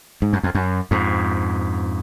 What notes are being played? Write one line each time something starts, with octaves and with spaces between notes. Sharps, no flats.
G#2
F#2
F2
F#2
F2 G#2